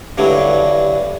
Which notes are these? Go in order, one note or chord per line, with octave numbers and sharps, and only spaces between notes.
G2 D3 E3 F#3